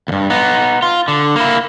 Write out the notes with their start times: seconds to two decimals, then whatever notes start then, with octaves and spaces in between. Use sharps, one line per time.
0.08 D2 G2
0.30 B3 D#4
0.82 F4
1.08 D3
1.36 A#3 E4